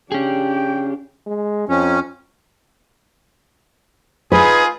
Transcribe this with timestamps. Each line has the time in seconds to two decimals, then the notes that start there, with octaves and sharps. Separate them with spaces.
0.12 C#4 D4 G4 G#4 G5
1.27 G#3
1.69 F2 C#4
4.32 D#4 F4 G#4 B4